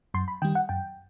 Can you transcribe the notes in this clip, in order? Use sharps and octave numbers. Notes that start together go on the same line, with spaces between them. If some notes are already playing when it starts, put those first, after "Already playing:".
F#2 C6
B5
D#3 G3 G5
F#5
F#2 G5